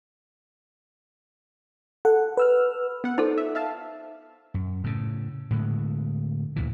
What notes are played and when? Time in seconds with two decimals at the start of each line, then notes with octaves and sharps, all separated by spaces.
2.05 A4 F#5
2.37 B4 E6 F6
3.04 B3 F#5
3.18 D#4 A4 C5 D5
3.38 E5
3.55 E5 F5 A5
4.54 F#2
4.84 A2 C#3
5.51 A2 D3 G#3
6.56 D2 A#2 E3